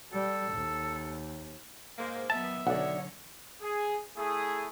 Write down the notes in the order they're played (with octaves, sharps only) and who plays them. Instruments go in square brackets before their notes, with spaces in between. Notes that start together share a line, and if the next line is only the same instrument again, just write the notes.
[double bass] G3 [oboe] A4
[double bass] D#2
[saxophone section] G#2 A#3 [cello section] C5
[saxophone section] D#3 D#4 E5 [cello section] F#3 B3 [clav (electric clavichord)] A5
[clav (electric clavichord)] B1 [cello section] D3 F#3 C#5 [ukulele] D5 F#5
[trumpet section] G#4
A3 E4 G#4